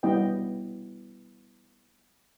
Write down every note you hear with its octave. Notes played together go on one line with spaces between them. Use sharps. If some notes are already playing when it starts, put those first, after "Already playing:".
G3 B3 E4 D#5 G5